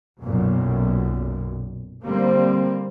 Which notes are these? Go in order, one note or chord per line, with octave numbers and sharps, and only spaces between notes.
B1 F#2 A#2
D3 G3 A#3 C4